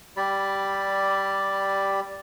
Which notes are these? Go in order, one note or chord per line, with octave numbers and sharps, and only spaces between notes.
G3 G4 D5 B5